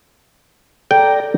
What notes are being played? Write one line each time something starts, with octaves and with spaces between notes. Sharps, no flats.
A4 D5 G5 A#5